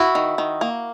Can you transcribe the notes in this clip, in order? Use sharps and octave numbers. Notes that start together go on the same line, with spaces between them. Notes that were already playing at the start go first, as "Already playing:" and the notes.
Already playing: E4 F#4
D#3
D#3
A#3